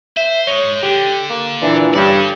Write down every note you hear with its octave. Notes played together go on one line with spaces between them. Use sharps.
C5 E5
G#3 D#4 C#5
D3 G4
A#3
A#2 E3 D4
G2 C#4 A4 D5